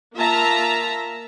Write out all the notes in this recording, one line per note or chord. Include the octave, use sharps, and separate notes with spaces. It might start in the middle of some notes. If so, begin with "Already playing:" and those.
A#3 F4 E5 A5 A#5